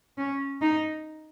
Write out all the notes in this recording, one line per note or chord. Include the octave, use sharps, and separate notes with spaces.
C#4
D#4